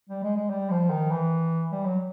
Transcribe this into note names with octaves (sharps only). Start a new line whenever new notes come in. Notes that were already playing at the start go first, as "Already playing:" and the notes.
G3
G#3
G#3
G3
F3
D#3
E3
G3
F#3